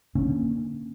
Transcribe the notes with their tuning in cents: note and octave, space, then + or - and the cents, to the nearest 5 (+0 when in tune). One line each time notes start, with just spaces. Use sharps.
D3 +0 A#3 +0 C#4 -15